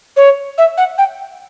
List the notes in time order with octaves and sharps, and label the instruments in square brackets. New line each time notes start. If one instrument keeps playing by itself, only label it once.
[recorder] C#5
E5
F#5
G5